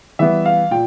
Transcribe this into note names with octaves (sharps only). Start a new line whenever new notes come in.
E3 G3 B3 E5
F5
A#2 G5